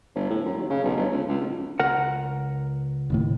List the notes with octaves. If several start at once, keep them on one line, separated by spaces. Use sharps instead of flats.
G1
A2
F#2
D#2
C#3
B1
G1
C#2
C#2
D1
C#2 A#4 F#5
D#1 D#2 A2